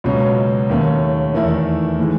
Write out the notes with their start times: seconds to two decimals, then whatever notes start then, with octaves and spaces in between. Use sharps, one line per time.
0.04 C#2 B2 F#3 C#4
0.69 D#2 D#3 A3 C#4
1.34 E2 D#3 A3 E4
1.99 A2 E3 G#3